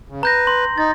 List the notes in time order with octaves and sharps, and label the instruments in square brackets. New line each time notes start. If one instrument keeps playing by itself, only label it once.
[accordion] C#3
[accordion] B4 [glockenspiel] A#5 G6 A#6
[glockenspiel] C6
[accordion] D#4 [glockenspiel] A6